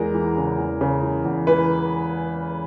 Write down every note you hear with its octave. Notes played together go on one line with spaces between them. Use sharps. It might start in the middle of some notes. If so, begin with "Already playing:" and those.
Already playing: E2 G#3 A#4
E3
C#3
E2
C#3
E3
E2
E3 B4